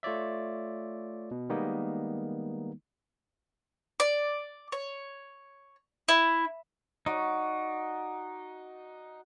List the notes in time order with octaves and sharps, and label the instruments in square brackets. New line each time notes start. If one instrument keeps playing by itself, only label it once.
[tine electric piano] A3 F4 C#5 D5 E5
B2
D#3 G3 G#3 A#3 B3 D#4
[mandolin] D5
C#5
E4
[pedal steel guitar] D#4 [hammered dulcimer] F#4 D5